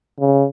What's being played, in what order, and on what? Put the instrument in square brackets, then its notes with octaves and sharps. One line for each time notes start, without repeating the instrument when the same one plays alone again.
[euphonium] C#3